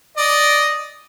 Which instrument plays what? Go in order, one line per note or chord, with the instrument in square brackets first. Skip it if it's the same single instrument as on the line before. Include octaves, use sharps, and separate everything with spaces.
[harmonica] D5 D#5